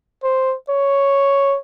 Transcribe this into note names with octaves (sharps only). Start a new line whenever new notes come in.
C5
C#5